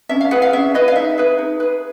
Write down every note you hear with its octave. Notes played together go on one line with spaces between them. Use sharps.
C#4 E5
F5
E4 G#4 B4 F#5
F5
C#4 E5
E4 G#4 B4 D#5
F5
D#4 E5
G#4 B4
D#4
G#4 B4